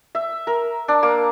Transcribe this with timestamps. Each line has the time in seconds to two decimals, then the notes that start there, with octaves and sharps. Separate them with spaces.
0.15 E5
0.47 A#4
0.88 D4
1.03 A#3